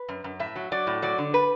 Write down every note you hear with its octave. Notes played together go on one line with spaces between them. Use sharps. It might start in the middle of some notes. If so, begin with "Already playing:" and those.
Already playing: B4
F#2
F#2
A2 E5
F#3
F#3 D5
A2
F#3 D5
D3
B4